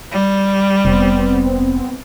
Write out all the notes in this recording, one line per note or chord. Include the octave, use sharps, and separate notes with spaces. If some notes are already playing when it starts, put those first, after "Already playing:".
G3
F1 B3 C4